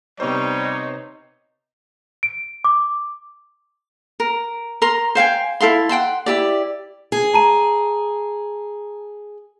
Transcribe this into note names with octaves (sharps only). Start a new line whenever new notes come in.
C3 G3 B3 D#4 C5 C#5
D7
D6
A#4
A#4 A#5 C6
C5 F5 G5 G#5
E4 A4 F5 C6
F#5 G5 A5 C6
E4 G4 D5
G#4
A5 A#5 D#7